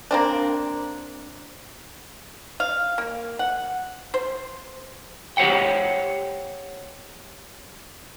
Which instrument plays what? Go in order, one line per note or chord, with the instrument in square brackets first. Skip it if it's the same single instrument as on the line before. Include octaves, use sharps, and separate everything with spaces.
[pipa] A#3 C4 D4
F5
A#3
F#5
C5
[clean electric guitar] G4 C5 C#5 F#5 G5